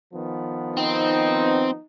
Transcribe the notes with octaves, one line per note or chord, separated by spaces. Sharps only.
D#3 F3 B3
C4 D#4